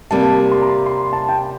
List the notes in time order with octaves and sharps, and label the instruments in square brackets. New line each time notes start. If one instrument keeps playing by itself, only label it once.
[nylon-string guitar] C3 G3 A#3 [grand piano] A5
[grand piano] C6
A#5
C6
A5
G5